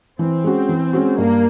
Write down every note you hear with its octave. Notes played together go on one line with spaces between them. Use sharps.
E3 C4
G#3 C#4 F#4
E3
G#3 C#4 F#4
G2 A#3